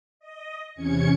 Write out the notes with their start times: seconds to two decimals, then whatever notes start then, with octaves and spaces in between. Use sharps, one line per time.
0.20 D#5
0.75 E2 C3 C#4 G#6 C#7